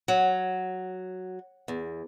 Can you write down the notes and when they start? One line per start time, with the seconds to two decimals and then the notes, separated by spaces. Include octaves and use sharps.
0.08 F#3
1.68 E2